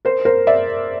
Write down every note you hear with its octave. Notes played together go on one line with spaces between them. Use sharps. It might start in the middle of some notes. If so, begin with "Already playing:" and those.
A#4 C5
A#4 C5
D5 E5